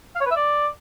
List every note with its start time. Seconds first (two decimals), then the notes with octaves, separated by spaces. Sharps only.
0.16 F5
0.21 C#5
0.26 B4
0.31 E5
0.36 D5